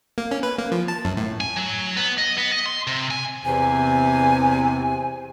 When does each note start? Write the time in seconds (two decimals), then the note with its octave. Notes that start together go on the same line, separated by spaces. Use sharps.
0.18 A#3
0.31 C#4
0.43 B4
0.58 A#3
0.72 F3
0.88 A5
1.05 F#2
1.17 A2
1.41 G#5
1.56 F#3
1.96 B3
2.18 D#5
2.38 B3
2.52 D#5
2.66 C6
2.87 C3
3.11 G#5
3.45 E2 C3 G#5